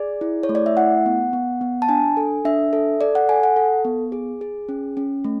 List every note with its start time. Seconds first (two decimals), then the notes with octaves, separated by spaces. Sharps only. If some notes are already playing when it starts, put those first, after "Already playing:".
Already playing: G#4 D5
0.21 E4
0.43 C#5
0.49 A3
0.55 D5
0.66 E5
0.77 E4 F#5
1.06 B3
1.33 B3
1.61 B3
1.82 A5
1.89 D4 G#5
2.17 A4
2.45 D4 E5
2.73 A4
3.01 A4 D5
3.15 F#5
3.29 A4 G#5
3.43 F#5
3.56 A4
3.85 B3
4.12 G#4
4.41 G#4
4.69 C#4
4.97 C#4
5.24 A3